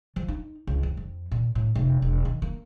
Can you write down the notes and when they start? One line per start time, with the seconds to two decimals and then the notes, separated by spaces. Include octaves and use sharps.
0.16 F3
0.28 D#4
0.67 C#2
0.83 F2
0.97 F2
1.31 A#2
1.55 A2
1.75 F1
2.02 E1
2.25 D#3
2.42 A#3